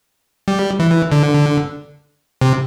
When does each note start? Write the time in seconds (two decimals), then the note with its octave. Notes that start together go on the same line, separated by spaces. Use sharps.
0.48 G3
0.80 E3
1.12 D3
2.41 C3